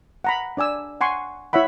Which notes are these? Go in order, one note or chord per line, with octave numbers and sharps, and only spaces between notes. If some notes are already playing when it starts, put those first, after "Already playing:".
F#5 A#5 B5
D4 D5 G#5 E6
F#5 G#5 C6 C#6
E4 C#5 E5 F#5 B5